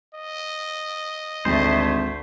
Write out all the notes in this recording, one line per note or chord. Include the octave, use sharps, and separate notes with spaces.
D#5
G#1 D2 A3 C5